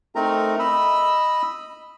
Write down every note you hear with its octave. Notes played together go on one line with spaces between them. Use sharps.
A3 C4 D#4 A#4 A#5
D#5 B5 E6